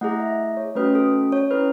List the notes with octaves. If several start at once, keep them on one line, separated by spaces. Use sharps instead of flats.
A3 E4 G#4 F#5
E5
C#5
A3 C#4 F#4 B4
A4
C#5
C#4 E4 A4 B4